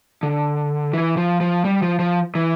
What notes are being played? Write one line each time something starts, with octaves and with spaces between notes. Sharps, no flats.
D3
E3
F3
F3
G3
F3
F3
E3